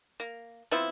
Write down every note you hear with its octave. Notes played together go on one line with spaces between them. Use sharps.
A#3
F3 B3 C4 E4